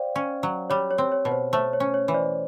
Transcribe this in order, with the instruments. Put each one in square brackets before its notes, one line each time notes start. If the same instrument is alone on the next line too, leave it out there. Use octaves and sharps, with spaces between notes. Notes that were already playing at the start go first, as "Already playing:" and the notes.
Already playing: [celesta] C5 D5 F5 G5
[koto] C#4
F#3
[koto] G3 [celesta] C#5
[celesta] C#5
[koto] C4
[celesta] C#5
[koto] B2
[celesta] C5
[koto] A3 [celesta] C5
[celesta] C#5
[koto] C#4
[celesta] C#5
[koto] E3
[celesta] C5 D5